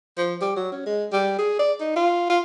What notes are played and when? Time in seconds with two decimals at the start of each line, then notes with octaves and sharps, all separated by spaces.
0.17 F3
0.41 G3
0.56 F#3
0.72 C#4
0.86 G#3
1.12 G3
1.39 G#4
1.59 D5
1.80 D#4
1.96 F4
2.29 F4